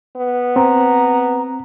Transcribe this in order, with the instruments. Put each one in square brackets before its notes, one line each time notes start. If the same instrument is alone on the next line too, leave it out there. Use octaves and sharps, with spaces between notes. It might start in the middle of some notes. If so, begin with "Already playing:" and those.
[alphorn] B3
[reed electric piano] C4 [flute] A#5